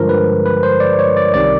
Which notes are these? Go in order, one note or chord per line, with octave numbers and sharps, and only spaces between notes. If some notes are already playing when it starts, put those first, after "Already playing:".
Already playing: G2 D3 F3 G#3 A#4
B4
B4
C5
D5
C#5
D5
C2 C3 D#3 D5